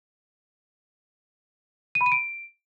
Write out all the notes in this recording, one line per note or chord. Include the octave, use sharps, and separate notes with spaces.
D#7
B5
D#7
D7